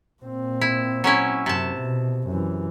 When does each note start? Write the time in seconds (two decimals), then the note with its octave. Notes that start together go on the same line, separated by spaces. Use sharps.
0.22 A#2 C4
0.61 E4
1.04 F#3 C#4 E4
1.46 F#2 C3 A5
1.77 B2
2.28 F#2 E3